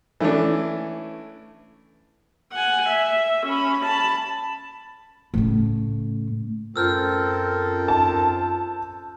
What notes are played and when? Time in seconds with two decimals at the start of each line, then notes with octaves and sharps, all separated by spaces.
0.20 E3 A3 C#4 D4
2.52 F#5 G#5
2.89 E5
3.46 C#4 B5
3.85 A5 B5
5.34 A2 C#3
6.76 F#2 C4 F4 A4 A#4 E6 F6 G6
7.88 A5